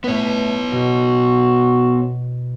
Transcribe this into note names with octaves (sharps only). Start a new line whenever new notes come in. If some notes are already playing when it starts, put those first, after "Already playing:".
A2 A3 B3 B4 C#5
B2 F#4